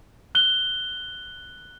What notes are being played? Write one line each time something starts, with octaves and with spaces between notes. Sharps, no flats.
F#6 G7